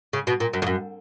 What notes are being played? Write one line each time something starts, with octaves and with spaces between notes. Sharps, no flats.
C#3
B2
A#2
F#2
F2
F#2